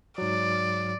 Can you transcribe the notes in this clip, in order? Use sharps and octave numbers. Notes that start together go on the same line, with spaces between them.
G#2 F#3 D5